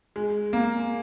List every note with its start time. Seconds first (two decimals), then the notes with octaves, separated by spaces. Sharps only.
0.16 G#3
0.53 A#3